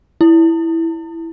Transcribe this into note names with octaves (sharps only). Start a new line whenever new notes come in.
E4